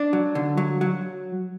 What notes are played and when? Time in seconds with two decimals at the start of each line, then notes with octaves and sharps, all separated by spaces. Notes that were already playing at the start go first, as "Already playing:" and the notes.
Already playing: D4
0.13 F#3
0.35 D3
0.57 F#3
0.81 F#3